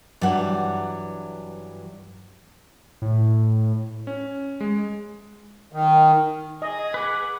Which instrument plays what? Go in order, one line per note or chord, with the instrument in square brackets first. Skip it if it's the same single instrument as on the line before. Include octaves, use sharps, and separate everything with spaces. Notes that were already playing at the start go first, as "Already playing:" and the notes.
[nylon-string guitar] G2 E3 F#3 [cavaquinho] D5 F#5
[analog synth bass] A2
[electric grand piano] C#4
G#3
[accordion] D#3
[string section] G#4 [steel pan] D#5
[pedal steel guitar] B4 F#5 [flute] D6